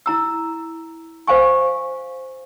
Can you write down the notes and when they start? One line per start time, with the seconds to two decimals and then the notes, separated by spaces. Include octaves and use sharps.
0.06 E4 A#5 E6
1.27 C5 F5 G#5 C#6